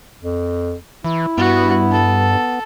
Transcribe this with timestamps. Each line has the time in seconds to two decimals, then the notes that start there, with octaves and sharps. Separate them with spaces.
0.23 F2
1.04 E3 E4
1.38 G2 B3 F#4
1.91 A4